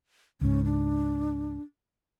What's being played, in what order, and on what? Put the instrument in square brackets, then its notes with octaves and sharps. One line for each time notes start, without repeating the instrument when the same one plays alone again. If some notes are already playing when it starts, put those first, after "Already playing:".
[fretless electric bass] C#2 G#2 [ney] C#4
[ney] D4